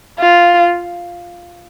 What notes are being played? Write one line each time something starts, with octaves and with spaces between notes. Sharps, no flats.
F4